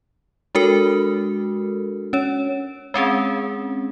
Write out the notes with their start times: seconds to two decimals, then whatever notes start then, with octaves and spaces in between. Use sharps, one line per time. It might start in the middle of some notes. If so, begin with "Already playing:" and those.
0.55 G#3 D4 F#4 A4 A#4
2.13 C#4 C#5
2.94 G#3 C4 C#4 G#4